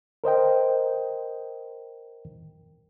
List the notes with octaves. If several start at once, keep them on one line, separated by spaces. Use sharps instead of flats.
A#4 C5 D#5 G5